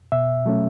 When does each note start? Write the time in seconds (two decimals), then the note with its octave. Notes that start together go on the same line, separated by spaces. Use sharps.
0.12 B2 E5
0.46 F#3 A3 C#4